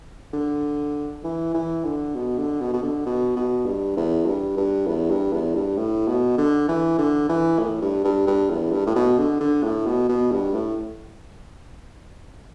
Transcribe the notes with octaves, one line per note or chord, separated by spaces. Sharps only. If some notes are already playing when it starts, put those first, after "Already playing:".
D3
E3
E3
D3
B2
D3
B2
B2
D3
B2
B2
G2
E2
G2
G2
E2
G2
E2
G2
A2
B2
D3
E3
D3
E3
A2
G2
G2
G2
E2
G2
A2
B2
D3
D3
A2
B2
B2
G2
A2